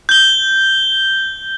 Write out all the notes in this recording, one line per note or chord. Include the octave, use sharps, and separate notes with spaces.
G6 G7